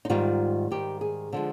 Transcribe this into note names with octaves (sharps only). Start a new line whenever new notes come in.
D#4
G#2 D#3 G3 F4
G#2 D#3 G3 G4
G#4
D3 F3 G#3